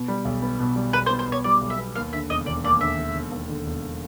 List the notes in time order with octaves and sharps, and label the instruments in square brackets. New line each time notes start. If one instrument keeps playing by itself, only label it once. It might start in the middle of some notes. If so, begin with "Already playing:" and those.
Already playing: [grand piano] B2
G3
B1
B3
B2
G3
[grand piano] B1 [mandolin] B4
[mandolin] C5
[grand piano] B3
[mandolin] C5
[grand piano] B2 [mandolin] C#5
[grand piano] G3 [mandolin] D5
[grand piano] B1
[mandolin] E5
[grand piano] B3
[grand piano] D#2 [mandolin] F5
[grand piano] D3 [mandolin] E5
[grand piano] E1 [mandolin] D#5
[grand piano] E1 [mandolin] D5
[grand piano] D#2 [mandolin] D5
[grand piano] D3 [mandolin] E5
[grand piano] E1
E1
D#2
D3
E1